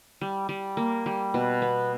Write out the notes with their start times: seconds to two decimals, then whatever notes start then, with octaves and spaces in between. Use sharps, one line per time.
0.21 G3
0.49 G3
0.77 A#3
1.06 G3
1.34 B2
1.62 B3